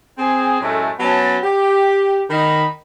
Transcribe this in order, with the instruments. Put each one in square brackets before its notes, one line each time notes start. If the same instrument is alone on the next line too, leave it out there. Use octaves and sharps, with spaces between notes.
[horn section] C4 G#4
F#2 A2 G#3 A3
F#3 B3 C#4 A5
G4
D#3 D#4 B5